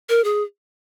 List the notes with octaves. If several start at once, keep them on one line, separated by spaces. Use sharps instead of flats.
A#4
G#4